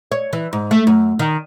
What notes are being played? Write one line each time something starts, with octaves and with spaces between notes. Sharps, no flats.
C#5
E3
G#2
A3
F#2
D#3